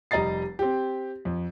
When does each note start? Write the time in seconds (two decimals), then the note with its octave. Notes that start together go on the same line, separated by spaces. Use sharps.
0.11 F1 G3 D#5 A#5 A6 C7
0.59 C4 G4
1.25 F2